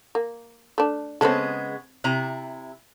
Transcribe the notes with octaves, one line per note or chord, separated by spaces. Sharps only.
A#3
A3 D4
C#3 G#3 B3 C4 A4
C3 E4 A#5